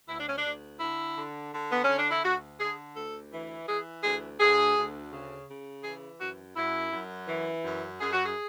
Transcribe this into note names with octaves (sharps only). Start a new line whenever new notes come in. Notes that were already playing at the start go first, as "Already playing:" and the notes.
D2 E4
D4
C#4
D4
D2
D3 E4
D3
D3
B3
D3 C#4
D4
E4
D2 F#4
D3 G#4
D2 A4
E3
E3 G#4
D2 G#4
D2 G#4
D2
C#3
C#3
E3 G#4
F#2 F#4
F#2 E4
F#2
E3
F#2
F#2 G#4
F#4
G#4